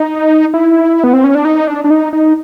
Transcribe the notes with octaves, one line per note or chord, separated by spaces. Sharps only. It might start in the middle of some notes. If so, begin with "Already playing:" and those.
Already playing: D#4
E4
B3
C4
C#4
D4
D#4
D4
D4
D#4
D#4